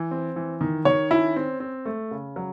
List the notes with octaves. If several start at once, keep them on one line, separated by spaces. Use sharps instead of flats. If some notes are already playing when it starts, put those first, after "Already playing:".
Already playing: E3
C4
E3
D#3
D#3 C#5
C#4 E4
C4
C4
A3
C#3
F#3